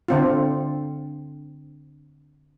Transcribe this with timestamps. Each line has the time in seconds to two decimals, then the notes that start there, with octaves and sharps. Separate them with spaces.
0.08 D3 C4 F4